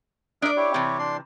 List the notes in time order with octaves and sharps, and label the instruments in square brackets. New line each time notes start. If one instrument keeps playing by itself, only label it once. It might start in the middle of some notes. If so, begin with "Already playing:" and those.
[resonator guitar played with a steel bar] D4 D5 [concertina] A#4 E5 D#6
[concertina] E4 G4 C#5
[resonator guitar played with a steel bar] C3 E3
[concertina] D4 D5 C6